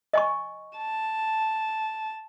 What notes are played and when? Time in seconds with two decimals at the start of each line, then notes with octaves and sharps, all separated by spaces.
0.13 D#5 G#5 C#6
0.77 A5